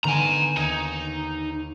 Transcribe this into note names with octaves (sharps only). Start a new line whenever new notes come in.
D3 D#3 B3 G#5 A#5
D#2 D#4 G#5